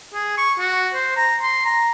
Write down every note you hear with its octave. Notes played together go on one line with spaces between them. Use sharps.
G#4
C#6
F#4
C5
A#5
C6
A#5